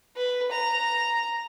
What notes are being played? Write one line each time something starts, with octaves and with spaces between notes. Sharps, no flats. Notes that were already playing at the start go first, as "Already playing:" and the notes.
B4
A#5